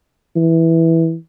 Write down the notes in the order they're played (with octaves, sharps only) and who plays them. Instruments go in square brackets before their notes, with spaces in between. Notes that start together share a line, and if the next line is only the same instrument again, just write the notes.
[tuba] E3